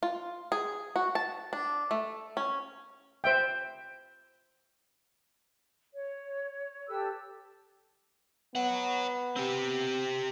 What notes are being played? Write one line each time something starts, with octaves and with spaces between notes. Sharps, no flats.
F4
G#4
F#4
A5
D4
A3
C#4
C5 E5 G5
C#5
G4 A4 B4 E6
B3 C#5 F#5
C4 G4